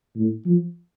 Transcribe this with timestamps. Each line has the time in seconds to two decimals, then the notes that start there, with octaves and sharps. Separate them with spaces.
0.15 A2
0.45 F3